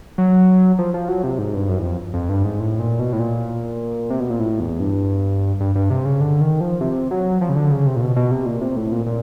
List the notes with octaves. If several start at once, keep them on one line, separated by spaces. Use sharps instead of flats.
F#3
F3
F3
F#3
C3
G#2
G2
F#2
E2
F2
F2
G2
G#2
A2
A#2
B2
A2
A#2
C3
B2
A#2
A2
E2
G2
G2
G2
C3
C#3
D3
D#3
F3
C3
F#3
F3
C#3
D3
C#3
C3
A#2
B2
B2
C3
A#2
C3
A2
A#2
A#2